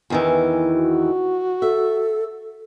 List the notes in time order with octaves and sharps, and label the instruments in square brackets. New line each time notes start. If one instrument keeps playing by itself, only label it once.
[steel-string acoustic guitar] E2 D#3 E3
[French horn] F#4
[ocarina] A4 [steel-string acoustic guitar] E5